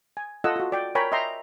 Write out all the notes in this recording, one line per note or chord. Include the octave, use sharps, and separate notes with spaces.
G#5
F4 A4 D#5 F#5 E6
F4 F#4
D5 G5
A#4 C#5 G5 G#5 A#5 B5
D#5 E5 G5 A#5 C6